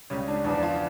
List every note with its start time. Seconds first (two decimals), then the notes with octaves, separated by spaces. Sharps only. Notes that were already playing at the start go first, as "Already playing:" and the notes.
0.10 C#2 C#3 G3 C#4
0.28 D4
0.44 E2 C#3 F3 D4
0.63 F4